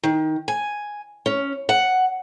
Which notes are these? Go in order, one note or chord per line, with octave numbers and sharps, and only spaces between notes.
D#3
G#5
C#4
F#5